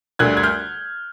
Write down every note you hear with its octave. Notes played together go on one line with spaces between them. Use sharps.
D2 D3 G3 F#6 G#6
G#6
F6 G6